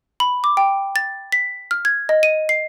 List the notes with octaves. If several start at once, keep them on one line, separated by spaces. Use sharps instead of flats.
B5
D6
G5
A6
B6
F6
G#6
D#5
D#7
C7